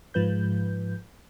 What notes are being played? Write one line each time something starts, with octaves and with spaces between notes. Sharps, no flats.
G#2 F3 B4 G6